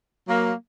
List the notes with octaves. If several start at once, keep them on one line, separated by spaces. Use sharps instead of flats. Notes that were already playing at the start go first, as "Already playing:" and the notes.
F#3 A#3